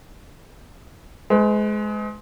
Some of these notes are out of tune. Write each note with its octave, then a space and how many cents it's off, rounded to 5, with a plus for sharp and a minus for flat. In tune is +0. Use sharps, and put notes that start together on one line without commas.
G#3 +25 B4 +45